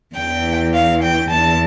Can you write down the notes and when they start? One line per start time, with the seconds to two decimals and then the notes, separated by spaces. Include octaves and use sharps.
0.16 E2 E3 G5
0.74 F5
1.03 G5
1.31 E2 E3 A5